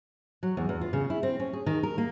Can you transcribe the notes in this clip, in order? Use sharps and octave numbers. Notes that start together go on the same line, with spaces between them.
F#3
E2
E2
F4
C#3
E4
C4
C#4
G#4
D#3
A#4
A#3